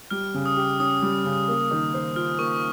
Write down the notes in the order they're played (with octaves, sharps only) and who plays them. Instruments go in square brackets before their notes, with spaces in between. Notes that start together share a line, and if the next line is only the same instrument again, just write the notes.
[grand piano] G3 [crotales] F6
[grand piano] C#3
[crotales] D#6
[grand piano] G4
[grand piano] C#4 [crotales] D#6
[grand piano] G3
C#3
A#3
D#3
C5
[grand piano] F4 [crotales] F6
[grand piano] A#3 [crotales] C#6